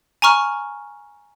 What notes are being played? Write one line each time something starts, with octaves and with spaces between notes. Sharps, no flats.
G#5 A#5 C#6 F6